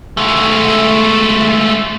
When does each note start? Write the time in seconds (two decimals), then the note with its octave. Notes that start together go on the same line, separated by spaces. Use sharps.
0.17 G#3 A3